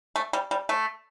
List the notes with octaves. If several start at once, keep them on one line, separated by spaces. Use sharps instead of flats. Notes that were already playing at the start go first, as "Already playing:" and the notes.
A3
G3
G3
A3